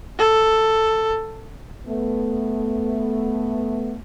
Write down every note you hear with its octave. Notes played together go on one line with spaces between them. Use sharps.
A4
A3 B3